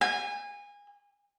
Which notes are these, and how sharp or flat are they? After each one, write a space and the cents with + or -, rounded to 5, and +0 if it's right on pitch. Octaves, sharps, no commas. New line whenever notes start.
G#5 -25